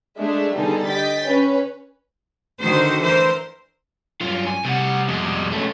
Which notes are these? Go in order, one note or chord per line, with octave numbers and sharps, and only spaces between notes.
G#3 A3 D4 E5
D3 G3 B3 D#4 G#4 A4
D#5 G5 A6 B6
C#4 B4
D3 D#3 F#4 C5
E3 A#4 C5
G2 F#3 F4
G#5
A2 C3 G3 F#5
F2 B2 G3 G#3
A3 C#4